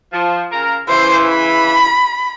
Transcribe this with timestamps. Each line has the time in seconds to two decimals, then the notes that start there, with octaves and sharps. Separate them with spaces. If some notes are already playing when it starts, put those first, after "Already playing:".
0.12 F3
0.52 C#3 F4 A#4
0.88 C#3 E3 C5
1.25 B5